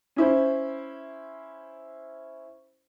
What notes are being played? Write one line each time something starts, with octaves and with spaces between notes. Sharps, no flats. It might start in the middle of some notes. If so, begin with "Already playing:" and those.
C#4 E4 C5